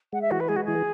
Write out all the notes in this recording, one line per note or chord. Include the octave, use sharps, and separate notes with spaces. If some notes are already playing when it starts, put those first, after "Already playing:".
G#3 F#5
E5
E3 F#4
B4
G#3 G#4
F#4
E3 G#4